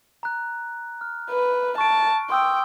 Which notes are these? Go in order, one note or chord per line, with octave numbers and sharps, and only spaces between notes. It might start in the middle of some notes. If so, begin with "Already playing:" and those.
A#5 F#6
F6
B4
A5 C#6 D7
G5 C6 D#6 E6